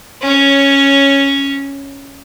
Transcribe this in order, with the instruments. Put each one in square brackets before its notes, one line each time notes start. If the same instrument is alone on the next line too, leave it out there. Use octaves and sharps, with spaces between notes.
[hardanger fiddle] C#4 C#5